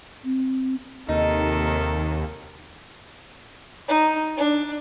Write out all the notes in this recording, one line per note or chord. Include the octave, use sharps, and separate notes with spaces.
C4
D#2 C3 D#3 D#4 A4
D#4
D4